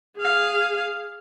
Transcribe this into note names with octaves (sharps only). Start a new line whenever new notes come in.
G#4 F5